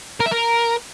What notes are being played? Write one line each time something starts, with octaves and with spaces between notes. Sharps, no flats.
A#4
E5
A#4